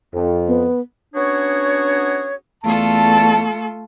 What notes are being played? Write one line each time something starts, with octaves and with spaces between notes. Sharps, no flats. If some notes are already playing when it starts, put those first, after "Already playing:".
F2
B3
B3 C#4 D4 F#4 G#4 C#5
E2 A3 F4 A4 D5 A5